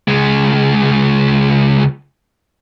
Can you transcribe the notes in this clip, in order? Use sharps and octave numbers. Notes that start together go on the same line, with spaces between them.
C#2 G#3